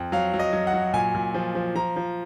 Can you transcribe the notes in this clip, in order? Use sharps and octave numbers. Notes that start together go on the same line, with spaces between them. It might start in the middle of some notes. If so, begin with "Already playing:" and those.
Already playing: F2
F#3 F5
F#3
D#5
F#3
F#5
F#3
A#2 G#5
A#2
F3
F3
F3 A#5
F3